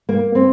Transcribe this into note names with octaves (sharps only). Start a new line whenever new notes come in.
A#3
C4